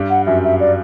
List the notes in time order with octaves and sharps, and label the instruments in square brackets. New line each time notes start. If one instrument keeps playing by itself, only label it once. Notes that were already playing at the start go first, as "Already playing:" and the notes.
Already playing: [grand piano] G2 G3
[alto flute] F#5
[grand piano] F#2 F#3 [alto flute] E5
[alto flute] E5
D5